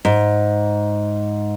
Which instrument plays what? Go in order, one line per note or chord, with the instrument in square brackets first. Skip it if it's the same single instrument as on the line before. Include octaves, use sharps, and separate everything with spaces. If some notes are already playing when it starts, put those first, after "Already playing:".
[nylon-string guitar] G#2